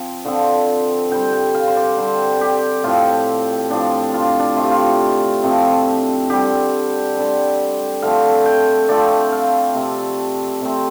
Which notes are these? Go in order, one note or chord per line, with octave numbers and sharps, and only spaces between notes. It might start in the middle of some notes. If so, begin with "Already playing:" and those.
Already playing: F3 C4
D3 F3 C4
D3 G3 C4 G5
G5
F5
C5
D5
D3 G3 C4 C5
G4
A2 F3 C4 F4
A2 F3 C4 D4
F4
D4
D4
C3 F3 A3 C4 F4
G4
F4
C3 F3 A3 C4
D3 G3 C4 G4
D3 G3 C4
D3 F3 A3 C4 F5
G5
D3 F3 A3 C4 D5
F5
C3 A3 C4
C3 A3 C4